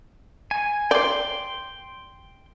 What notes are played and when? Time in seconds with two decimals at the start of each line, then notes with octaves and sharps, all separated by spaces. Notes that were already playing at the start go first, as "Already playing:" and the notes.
0.51 G#5
0.91 D5 G5 C6